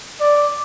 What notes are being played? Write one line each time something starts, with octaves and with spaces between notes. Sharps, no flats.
D5